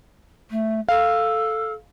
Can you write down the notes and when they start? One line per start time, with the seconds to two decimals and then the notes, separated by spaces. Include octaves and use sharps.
0.51 A3
0.89 A4 F5